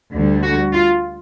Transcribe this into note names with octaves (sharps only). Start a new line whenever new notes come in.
D2 D3 G3
F#4
F4